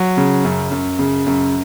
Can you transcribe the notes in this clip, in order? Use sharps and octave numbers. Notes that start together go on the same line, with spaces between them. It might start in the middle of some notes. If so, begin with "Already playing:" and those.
Already playing: F#3
C#3
F#2
F#2
C#3
F#2